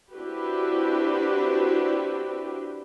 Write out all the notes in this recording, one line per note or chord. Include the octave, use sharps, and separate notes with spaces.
C4 D4 E4 F#4 G4 B4